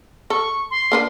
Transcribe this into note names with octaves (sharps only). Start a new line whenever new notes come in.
A4 C#6
C6
A#3 D4 B4